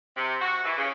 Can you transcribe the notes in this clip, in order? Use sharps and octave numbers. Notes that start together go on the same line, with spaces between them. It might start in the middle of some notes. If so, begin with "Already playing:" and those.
C3
F#4
E3
C#3